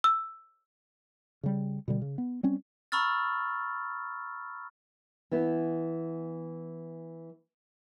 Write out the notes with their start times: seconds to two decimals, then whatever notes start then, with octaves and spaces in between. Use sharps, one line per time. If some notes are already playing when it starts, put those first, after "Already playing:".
0.04 E6
1.43 C#3 G3
1.88 B2 D3 G3
2.02 C#3
2.18 B3
2.43 G3 C4 C#4
2.92 A#5 B5 C#6 E6 F6 A6
5.31 E3 B3 E4